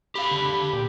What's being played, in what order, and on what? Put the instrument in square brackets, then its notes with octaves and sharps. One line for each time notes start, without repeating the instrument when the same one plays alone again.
[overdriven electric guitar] G4 F5 [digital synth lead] B5
[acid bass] D3
D3
[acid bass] A#2 [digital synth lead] G4